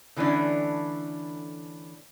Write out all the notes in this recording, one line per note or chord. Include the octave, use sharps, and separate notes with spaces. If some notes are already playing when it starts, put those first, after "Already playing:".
D3 E3 A3 C#4 D4